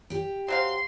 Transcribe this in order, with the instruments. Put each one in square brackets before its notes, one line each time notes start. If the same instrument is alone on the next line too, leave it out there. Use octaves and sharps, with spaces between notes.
[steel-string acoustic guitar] G4 G5
[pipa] F#3 C4 F5 [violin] C6